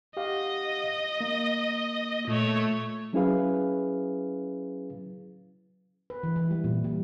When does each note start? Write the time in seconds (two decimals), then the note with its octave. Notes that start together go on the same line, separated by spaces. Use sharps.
0.17 G4 D#5 F5 F#5
1.20 A#3
2.27 A#2 A3 C#5
3.13 F#3 C#4 E4 G#4 B4 F5
6.10 B4
6.23 E3
6.36 E3
6.51 G3
6.64 A#2
6.84 G3